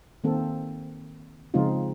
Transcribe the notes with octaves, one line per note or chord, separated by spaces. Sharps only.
D#3 A#3 C4 A4
C#3 F3 G#3 C4 D#4 F4